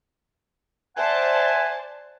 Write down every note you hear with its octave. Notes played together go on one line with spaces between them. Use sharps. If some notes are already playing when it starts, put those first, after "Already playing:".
C5 D5 E5 F#5 G#5 A5